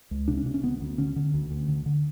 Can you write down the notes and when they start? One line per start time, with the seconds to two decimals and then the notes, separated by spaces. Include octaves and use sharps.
0.11 C#2
0.28 C3 D4
0.37 C#4
0.46 C3 D4
0.54 C#4
0.63 D2 B3
0.81 D2
0.98 D3 C#4
1.16 D3
1.34 D2
1.51 D2
1.68 D3
1.86 D3